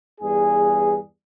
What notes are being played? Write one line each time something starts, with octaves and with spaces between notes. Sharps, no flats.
E2 G2 G#4